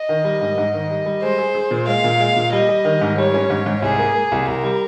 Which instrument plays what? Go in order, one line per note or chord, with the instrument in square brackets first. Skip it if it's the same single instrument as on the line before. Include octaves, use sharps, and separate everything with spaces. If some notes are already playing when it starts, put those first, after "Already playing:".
Already playing: [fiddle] D#5
[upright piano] D#3
G3
G#2
G#2
D#3
G3
G3
[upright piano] G#3 [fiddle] C5
[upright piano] G#4
G#4
A#2
[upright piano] G#3 [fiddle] F5
[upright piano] A#2
G#3
A#2
[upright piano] G3 [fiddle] D#5
[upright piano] G3
D#3
G#2
[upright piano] G3 [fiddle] C#5
[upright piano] C#4
G#2
G#2
[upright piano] C2 [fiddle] G#4
[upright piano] A#3
A#3
C2
[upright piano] C2 [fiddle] A#4
[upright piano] G3